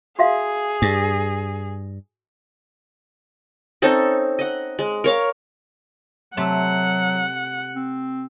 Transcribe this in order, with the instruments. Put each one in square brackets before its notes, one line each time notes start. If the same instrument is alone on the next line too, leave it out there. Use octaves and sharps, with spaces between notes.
[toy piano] F#4 E5 F5 [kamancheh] G#4
[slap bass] G2
[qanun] C4 C#4 D#4 A4
D#5 F#5
G#3
A#4 C#5 F5
[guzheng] C3 A3 A5 [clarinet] F#3 [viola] F#5
[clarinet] C4